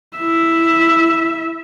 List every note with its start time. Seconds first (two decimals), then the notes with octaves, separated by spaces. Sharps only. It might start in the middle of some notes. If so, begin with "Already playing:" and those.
0.17 E4 E5